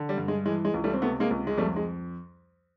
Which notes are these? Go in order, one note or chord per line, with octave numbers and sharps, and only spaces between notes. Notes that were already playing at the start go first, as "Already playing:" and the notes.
Already playing: D3
G3
G2
G#3
E3 G#3
G#3
C#2
G3 A3
C4
C3 A3 B3
G#3 A#3
C#2
G#3
F2 G3 A3
G#3